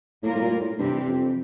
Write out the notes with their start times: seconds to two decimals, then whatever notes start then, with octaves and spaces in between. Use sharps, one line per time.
0.23 A2 G3 A#3 F4 A#4
0.35 A2
0.42 A#2
0.61 A2
0.79 G2 C3 E3 G3 C4 G4
1.08 F2